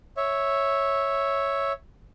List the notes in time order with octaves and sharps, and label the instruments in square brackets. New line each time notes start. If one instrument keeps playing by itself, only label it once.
[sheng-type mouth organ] C#5 E5